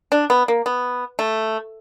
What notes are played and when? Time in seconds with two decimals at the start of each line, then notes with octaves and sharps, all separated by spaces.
0.12 D4
0.30 B3
0.48 A#3
0.66 B3
1.19 A3